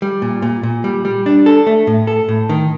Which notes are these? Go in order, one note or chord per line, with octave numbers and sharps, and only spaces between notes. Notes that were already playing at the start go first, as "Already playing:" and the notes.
G3
A#2
A#2
A#2
G3
G3
D4
A4
A3
A2
A4
A2
D#3